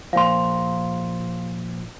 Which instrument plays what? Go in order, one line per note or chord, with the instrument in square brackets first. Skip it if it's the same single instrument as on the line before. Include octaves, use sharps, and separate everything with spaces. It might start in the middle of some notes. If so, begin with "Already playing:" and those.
[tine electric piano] A#2 F3 [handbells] F5 C6